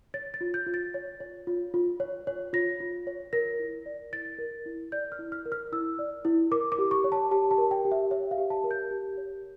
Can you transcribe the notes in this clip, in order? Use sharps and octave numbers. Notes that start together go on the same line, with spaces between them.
C#5 A6
A6
F4
G6
F4
A6
C#5
C#5
F4
F4
C#5
C#5
F4 A#6
F4
C#5
A#4 A#6
E4
D5
E4 A6
A#4
E4
D5 G6
F6
E4
F6
A#4
F6
E4 E6
D5
E4
A#4 D6
D6
G4
C#6
C#5
A5
G4 A5
A5
A#4
G5
G4
E5
C#5 E5
F5
G4
A5
A#4
G6
G4
C#5